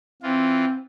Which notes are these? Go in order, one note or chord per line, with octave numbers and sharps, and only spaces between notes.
E3 C4 F4